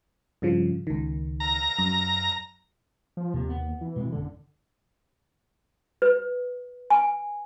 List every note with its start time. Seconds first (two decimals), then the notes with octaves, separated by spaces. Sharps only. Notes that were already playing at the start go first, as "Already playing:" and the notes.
0.42 G2 C#3 F3
0.87 C#2 D#3
1.40 A#5
1.79 F#2
3.17 F3
3.34 D#2 C3
3.49 B3
3.81 E3
3.96 B2 G#3 C4
4.12 F#1 D3 C#4
6.02 B4
6.90 G#5